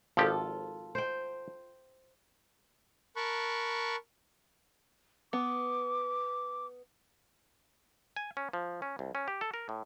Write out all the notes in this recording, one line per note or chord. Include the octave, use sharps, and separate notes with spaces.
G#1 F3 F4 G4 A4
C5 G5
A#4 A5 B5 C#6 F#6
B3 D6
G#5
C#4
F3
C#4
C2
C#4
G4
A4
A#4
A2